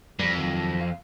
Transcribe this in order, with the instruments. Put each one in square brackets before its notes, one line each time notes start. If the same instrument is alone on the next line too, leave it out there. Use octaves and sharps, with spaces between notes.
[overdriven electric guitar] F2 [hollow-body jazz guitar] G3
[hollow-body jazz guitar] D#2 F#3
F5